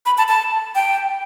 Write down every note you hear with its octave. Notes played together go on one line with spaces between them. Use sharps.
B5
A5
A5
G5